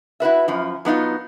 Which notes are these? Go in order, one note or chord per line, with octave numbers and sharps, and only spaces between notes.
E4 F#4 B4 E5
F#2 F3
F#3 B3 D#4 F4